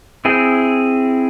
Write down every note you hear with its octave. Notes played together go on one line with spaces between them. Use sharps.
C4 E4 G#4